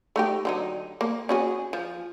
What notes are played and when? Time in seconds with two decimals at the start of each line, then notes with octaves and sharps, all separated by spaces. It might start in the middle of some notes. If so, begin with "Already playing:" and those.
0.16 A3 D#4 G4
0.45 D3 F#3 D#4
1.01 A#3
1.29 C#4 F#4 G#4
1.73 F3